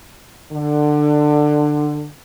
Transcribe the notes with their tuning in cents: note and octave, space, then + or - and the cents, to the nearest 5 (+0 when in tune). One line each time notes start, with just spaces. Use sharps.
D3 +20